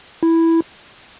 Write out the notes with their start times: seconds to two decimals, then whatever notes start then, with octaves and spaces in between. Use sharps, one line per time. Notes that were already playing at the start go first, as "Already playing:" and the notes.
0.23 E4